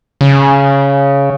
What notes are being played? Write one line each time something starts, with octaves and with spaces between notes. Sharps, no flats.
C#3